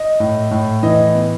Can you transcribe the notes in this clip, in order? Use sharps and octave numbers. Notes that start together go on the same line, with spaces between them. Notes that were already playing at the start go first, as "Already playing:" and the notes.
Already playing: D#5
A2
A2
E3 D#5
B3